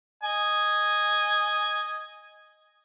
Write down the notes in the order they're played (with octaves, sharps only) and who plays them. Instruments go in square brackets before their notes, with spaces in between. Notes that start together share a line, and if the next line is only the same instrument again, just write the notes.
[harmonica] D#5 G#5